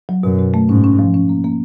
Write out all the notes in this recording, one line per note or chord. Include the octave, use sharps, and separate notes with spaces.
F#3
F#2 B2
B2
A3
G#2 C#4
C#4
F3
C#4
A#3
A#3